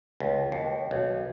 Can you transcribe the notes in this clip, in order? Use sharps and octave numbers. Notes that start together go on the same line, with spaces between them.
C#2
D#2
B1